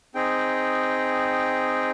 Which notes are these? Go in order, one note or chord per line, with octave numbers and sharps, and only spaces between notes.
C4 D#4 G#4 G5